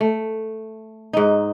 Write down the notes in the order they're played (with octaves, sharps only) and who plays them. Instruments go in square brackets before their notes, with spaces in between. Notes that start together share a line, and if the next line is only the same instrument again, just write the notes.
[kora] A3
G#2 D#4